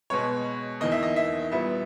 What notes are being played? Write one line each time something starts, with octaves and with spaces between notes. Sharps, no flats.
B2 G#3 B3 C#5
E2 D#3 A#3 D#5
E5
D#5
E5
A#2 G3 B3 E5